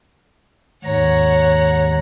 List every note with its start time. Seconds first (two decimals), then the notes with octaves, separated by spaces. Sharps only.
0.85 D#2 G#2 C#5 F#5 A#5